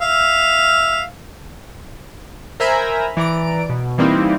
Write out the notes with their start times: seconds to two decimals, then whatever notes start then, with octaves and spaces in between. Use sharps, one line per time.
0.01 E5 F5
2.60 A#4 C5 E5 G#5 A#5 B5
3.17 E3 D5 A#5 D7
3.69 B2
3.98 E3 G3 A#3 C4 D#4 E4